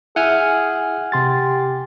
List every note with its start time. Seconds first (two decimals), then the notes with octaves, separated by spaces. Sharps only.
0.16 E4 G#4 E5 F#5 G#5 F6
1.12 C3 G4 C6 A6